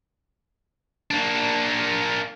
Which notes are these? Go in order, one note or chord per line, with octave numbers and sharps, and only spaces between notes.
A#3 D4